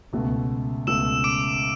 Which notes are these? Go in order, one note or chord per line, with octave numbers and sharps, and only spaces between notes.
C#2 B2 A3
C#2 B2 A3 E6 E7
D6 D7